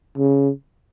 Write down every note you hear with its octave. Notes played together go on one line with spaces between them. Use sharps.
C#3